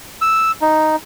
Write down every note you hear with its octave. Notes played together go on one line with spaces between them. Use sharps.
E6
D#4